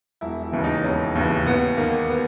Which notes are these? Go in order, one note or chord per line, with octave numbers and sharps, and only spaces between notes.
E1 E4
E4
D#2 C#3 E3
D#4
E1 C#4
D#2 C#3 E3
D#2 B3
D#3 A#3
B3